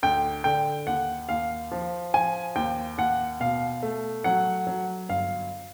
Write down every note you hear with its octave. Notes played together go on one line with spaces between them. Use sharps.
D2 G5
D3 G5
D#2 F#5
D#2 F5
F3
F3 G#5
D#2 G5
D#2 F#5
B2 F5
A3
F#3 F#5
F#3
G1 F5